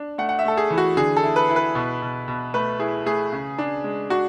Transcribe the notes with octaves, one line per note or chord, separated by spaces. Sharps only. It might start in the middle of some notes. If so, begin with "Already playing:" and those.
Already playing: D4
A3 F#5
F#5
E5
A3 A4
G#4
E3
F#4
D3 G#4
A4
E4
B4
E4
B4
B2
B2
B2
A3 B4
E4 G#4
A3 G#4
C#3
D4
G#3
D4 F#4